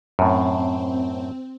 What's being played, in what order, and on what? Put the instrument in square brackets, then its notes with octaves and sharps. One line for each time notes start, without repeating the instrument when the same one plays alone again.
[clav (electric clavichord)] F#2 A2 [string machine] C4